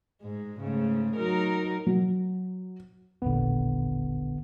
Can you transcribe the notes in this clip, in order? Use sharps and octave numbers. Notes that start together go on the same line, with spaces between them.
G#2 G#3
G#2 C#3 A3
F#3 D#4 A#4
F#3
D#1 A1 A#2 D3 B3